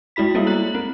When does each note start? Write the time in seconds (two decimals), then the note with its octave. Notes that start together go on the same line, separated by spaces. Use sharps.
0.16 G#3 E4 F#4 B5 B6
0.34 G3 A#3 B3 E4
0.47 A#5 F#6 F#7
0.75 C4